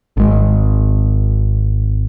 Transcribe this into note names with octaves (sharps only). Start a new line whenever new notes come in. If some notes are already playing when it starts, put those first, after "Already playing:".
G#1 G#3